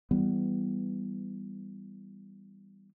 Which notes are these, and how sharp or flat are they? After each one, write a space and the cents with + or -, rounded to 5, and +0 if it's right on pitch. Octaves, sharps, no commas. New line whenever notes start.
E3 +0 G3 +0 B3 +10